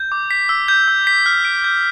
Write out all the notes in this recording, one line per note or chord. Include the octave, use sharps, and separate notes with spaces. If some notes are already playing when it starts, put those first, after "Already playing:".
Already playing: G6
D6
B6
E6
G6
E6
B6
F6
D7
G6